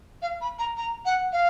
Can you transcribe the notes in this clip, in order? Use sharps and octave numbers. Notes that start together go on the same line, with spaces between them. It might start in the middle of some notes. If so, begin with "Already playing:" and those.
F5
B5
A#5
A#5
F#5
F5